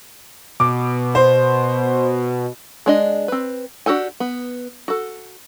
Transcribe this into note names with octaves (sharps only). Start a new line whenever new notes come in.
B2 D6
C5
G#3 D4 D#5
C4 B4
D4 F#4 G4 A4 G#5
B3
F#4 A4